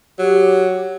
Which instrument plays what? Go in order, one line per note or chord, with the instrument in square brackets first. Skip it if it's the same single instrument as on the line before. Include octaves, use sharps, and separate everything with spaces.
[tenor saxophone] F#3 [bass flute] G4